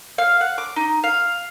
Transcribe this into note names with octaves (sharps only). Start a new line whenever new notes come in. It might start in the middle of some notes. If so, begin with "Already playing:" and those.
F5
F#5
D6
D#4
F5